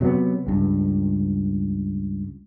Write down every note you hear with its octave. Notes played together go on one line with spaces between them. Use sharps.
C3 F#3 A#3 B3
C#2 G2